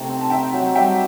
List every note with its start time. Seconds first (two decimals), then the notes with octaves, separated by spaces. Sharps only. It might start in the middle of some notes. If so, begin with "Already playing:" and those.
Already playing: C3 A3 D#4 G4
0.09 C4
0.21 A5
0.30 D#4 E5 G5
0.53 F#3
0.75 G3 E5 G5